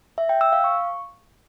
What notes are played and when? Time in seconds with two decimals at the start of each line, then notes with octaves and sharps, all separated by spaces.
0.18 E5
0.29 G5
0.41 E6
0.53 F5
0.64 C#6